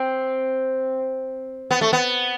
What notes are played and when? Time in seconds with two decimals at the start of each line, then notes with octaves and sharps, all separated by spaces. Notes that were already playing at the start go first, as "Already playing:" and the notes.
Already playing: C4
1.71 B3
1.81 A3
1.93 B3